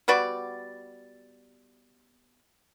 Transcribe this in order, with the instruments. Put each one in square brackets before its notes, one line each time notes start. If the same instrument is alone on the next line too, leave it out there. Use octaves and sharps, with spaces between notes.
[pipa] G3 B3 F#4 D5